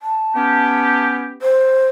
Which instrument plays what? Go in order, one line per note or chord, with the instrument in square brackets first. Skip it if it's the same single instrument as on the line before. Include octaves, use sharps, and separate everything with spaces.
[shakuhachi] A5
[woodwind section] B3 C#4 G4
[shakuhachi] C5